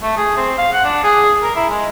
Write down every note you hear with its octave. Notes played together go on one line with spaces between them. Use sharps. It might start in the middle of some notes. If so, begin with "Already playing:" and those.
A3
G#4
C4
F5
F#5
D4
G#4
A#4
E4
G#3